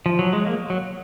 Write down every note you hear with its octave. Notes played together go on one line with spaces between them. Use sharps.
F3
F#3
G#3
A#3
F#3